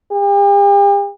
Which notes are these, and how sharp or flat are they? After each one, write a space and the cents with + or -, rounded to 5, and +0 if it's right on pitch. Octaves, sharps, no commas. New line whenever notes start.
G4 +40